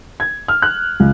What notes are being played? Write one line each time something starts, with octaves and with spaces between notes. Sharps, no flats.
G#6
F6
F#6
C#2